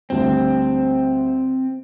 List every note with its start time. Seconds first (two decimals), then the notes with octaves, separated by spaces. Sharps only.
0.10 D2 G3 C4